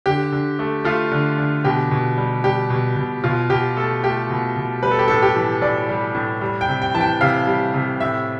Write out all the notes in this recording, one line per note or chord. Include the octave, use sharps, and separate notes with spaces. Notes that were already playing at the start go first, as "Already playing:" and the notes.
D3 G4
D3
A3
A3 F4
D3
D3
B2 G4
B2
G3
G3 G4
B2
B2
B2 F4
B2 G4
A3 A4
A3 G4
B2
B2
G3 B4
A4
G4
A2 A4
G4
E3
A2 D5
G3
A2
G3
G5
C3
G5
E3 A5
G5
C3 F5
G3
C3
A2 E5